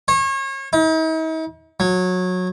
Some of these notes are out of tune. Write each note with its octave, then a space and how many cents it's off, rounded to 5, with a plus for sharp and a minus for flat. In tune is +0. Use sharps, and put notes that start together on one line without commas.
C#5 -35
D#4 +45
F#3 -20